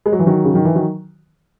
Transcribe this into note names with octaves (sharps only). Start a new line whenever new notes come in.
G#3
F#3
E3
D#3 F#3
C#3
D#3
E3
D#3 F#3